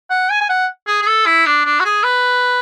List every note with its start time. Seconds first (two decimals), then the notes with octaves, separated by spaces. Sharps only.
0.10 F#5
0.30 G#5
0.41 G#5
0.49 F#5
0.87 G#4
1.02 G#4
1.07 A4
1.26 E4
1.46 D4
1.65 D4
1.80 F#4
1.85 G#4
2.03 B4